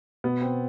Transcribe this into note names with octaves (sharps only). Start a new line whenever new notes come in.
B2 B3
C4